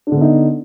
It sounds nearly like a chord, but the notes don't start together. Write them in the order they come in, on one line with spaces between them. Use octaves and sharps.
D4 D3 B3 D#4